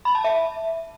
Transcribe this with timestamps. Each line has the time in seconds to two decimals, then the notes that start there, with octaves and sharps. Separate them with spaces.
0.05 B5
0.15 A5
0.24 E5